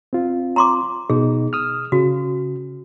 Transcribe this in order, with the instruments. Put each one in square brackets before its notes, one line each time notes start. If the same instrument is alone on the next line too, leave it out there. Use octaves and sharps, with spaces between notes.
[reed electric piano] C4 F4
[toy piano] A#5 C6 D6
[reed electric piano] B2 D#4 [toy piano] G#4
[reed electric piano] D#6 F6
[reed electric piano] C#3 [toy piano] F#4